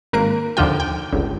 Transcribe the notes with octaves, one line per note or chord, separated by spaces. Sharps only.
G#1 A#3 A#4 F#6 D7
D#2 D3 F3 F4 G5
G5
G1 C#2